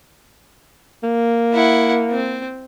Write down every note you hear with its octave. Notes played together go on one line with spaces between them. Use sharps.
A#3
E4 F#5
C4